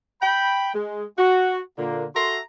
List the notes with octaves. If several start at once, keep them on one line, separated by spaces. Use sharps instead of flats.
G5 B5
G#3
F#4
A#2 D3 A#3
F#4 A4 E5 A#5 C6